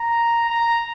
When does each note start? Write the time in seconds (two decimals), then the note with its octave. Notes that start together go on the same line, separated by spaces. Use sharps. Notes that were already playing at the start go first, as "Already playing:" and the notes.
Already playing: A#5
0.49 A#5